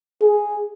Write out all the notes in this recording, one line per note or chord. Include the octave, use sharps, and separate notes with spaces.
G#4